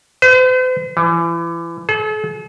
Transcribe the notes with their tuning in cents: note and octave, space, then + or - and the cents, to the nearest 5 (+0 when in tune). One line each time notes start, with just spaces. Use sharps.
C5 -45
E3 +35
A4 -45